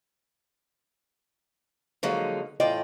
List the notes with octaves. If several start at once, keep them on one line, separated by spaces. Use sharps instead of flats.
D3 F3 F#3 G#3 A#3 D#4
A2 E3 F4 D5 D#5 G5